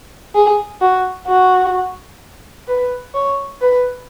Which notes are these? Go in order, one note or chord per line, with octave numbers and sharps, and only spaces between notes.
G#4
F#4
F#4
B4
C#5
B4